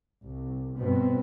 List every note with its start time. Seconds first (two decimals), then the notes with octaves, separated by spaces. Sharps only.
0.25 C2
0.76 G2 B2 B3 C4